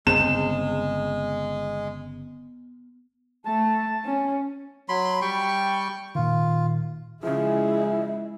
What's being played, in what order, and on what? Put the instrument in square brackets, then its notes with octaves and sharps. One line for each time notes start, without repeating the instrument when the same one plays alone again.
[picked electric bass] G1 C#3 C4 [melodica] G#3 [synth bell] B3 [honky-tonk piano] E7
[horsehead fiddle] A3 [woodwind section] A5
[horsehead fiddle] C#4
[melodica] F#3 B5 C6
G3 G5 C#6
[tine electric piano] A#2 D#3 [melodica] F4
[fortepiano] C#3 F3 [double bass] G#3 E4 [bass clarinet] G#4 [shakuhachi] E5